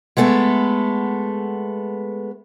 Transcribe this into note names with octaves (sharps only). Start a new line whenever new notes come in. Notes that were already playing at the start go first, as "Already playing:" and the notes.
G#3 A3 B3 A4